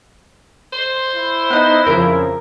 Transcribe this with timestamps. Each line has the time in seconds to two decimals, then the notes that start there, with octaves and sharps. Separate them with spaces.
0.73 C5 C6
1.16 E4
1.50 B3 D#4 D#5 F#6
1.86 F2 C#3 F3 A#4